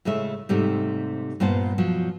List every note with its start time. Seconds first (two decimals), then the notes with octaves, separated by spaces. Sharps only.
0.05 A2 C#3 G#3 A3 E5
0.49 G#2 C3 G3 A3
1.40 G2 A#2 B3 C5 A5
1.78 B2 F3 F#3